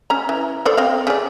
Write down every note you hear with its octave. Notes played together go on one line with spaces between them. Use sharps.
C#4 A#5
E3
A4 C5 D5
C4 F5
C#3 D5